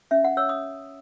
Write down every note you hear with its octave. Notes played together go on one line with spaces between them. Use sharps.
C#4 E5
F#5
C#5 E6
D#6